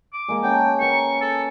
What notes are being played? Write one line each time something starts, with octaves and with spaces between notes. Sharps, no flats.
D6
G#3 A#3
C#4 F#5 G5 A5
A#4 B4 C#6
A4